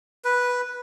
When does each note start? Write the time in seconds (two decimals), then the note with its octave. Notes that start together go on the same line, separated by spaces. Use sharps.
0.25 B4